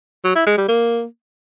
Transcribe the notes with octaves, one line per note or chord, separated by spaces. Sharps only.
F#3
E4
G#3
G3
A#3